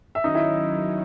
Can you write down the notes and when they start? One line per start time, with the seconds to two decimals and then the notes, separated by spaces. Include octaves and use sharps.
0.15 E5
0.24 D#3 F#3 C#4 D#4 D#5
0.35 E4 E5